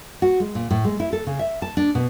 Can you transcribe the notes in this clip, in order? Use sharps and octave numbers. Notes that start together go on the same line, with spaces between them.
F#4
G#3
A#2
A2
G#3
E4
A4
C#3
E5
A5
D4
B2